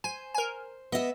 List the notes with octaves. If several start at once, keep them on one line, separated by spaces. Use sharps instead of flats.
C5 G#5
A#4 G#5
B3 D#5 E5